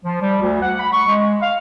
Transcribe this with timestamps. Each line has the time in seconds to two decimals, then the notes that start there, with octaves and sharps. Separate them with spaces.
0.04 F3
0.21 G3
0.41 D2
0.61 F#5
0.79 B5
0.93 C#6
1.07 G#3
1.41 F5